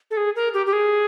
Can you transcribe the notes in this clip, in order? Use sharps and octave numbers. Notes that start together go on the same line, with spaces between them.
A4
G#4
A#4
G4
G4
G#4